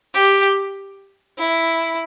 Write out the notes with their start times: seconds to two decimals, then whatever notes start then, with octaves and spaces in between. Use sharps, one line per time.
0.14 G4
1.38 E4